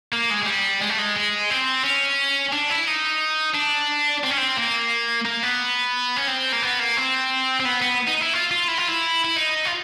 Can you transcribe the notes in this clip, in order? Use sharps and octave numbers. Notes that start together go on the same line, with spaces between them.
A#3
G#3
G#3
G3
G#3
A3
G#3
G#3
C4
C#4
D4
E4
D#4
D4
C4
C#4
C4
A#3
A#3
B3
C#4
C4
A#3
B3
A#3
C4
C4
B3
B3
D#4
E4
F4
F4
E4
F4
E4
E4
D#4
F4